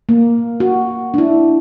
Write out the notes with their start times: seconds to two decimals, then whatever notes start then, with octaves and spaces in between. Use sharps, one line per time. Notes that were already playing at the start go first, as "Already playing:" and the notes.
0.09 A#3
0.60 F#4
1.14 D4 E4